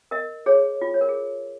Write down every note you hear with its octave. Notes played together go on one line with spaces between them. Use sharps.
A#4 D#5
G#4 C#5
F4
C#5
A#4
G#4